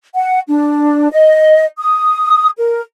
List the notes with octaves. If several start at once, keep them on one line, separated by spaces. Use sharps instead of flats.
F#5
D4
D#5
D#6
A#4